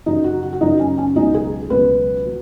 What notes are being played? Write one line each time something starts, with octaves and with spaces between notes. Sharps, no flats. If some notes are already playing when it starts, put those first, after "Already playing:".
F#2 C#3 F#3 D#4
F#4
F#4
F#4
F#2 C#3 F#3 D#4
C#4
C#4
C#2 B2 F#3 D#4
G#4
C#2 B2 F#3 B4
F#3